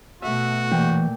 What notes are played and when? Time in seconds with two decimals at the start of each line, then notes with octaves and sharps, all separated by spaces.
0.22 B2 A3 F#4 E5
0.72 A#2 E3 G5